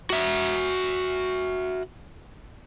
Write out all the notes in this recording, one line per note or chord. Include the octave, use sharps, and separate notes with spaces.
F#4 E5